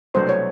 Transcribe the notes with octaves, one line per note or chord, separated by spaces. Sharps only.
C2 B2 F#3 A3 D4 C5
C#5